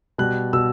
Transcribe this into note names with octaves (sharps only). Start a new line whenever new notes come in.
B2 G3 F#6
B2 E6